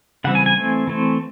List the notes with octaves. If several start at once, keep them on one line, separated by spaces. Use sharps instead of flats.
C#3 E3 G3 C4 F#5
G#5
G#5
E3 A3 C4
E3 A3 C4